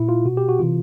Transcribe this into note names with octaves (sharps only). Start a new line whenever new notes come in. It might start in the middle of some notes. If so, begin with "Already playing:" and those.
Already playing: A#2 E4
F4
B2 F#4
G4
F#4
C3 E3 F4